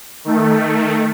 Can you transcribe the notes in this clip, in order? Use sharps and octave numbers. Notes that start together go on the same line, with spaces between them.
D#3 A3